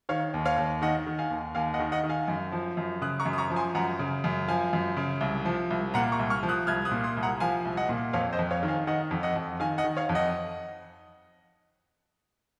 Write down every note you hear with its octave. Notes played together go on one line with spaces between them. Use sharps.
D#3 C#5 F5
D#2
C#5 F5
D#2
D#3 D#5 F#5
D#3
F5 G#5
D#2
D#2 F5 G#5
D#5 F#5
D#3
D#5 F#5
D#3
F5 G#5
F#2
F3
F#2
C#3 D#6 F#6
A#5 C#6
F#2
D#6
A#5 C#6
F3
G#5 C6
F#2 F#5 A#5
C#3
F#2
F3 F5 G#5
F#2
C#3
C2
F3
C2
A#2 F#5 A#5
A#5 C#6
C2
C#6 F6
F3
D#6 F#6
C2 F6 G#6
D#6 F#6
A#2
C6 D#6
C2
F#5 A#5
F3 F5 G#5
C2
D#5 F#5
A#2
F2 C#5 F5
C5 D#5
F2
C#5 F5
D#3
F5 G#5
D#3 D#5 F#5
F2
D#5 F#5
F2
D#3 F5 G#5
D#5 F#5
D#3
C#5 F5
F2
D#5 F#5